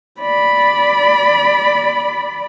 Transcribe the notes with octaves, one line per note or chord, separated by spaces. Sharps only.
D5 B5